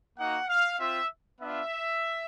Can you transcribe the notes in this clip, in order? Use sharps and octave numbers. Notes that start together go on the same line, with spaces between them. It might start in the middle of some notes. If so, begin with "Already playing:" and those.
A#3 D#4 F#4 F#5
F5
C4 F4 E5
B3 D4 F4 E5